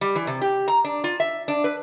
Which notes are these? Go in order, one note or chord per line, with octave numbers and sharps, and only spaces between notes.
G3
E3
C3
G4
A#5
D4
F4
E5
D4
B4